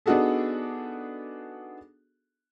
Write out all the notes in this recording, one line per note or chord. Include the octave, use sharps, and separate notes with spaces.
B3 D4 D#4 F#4 G#4 A4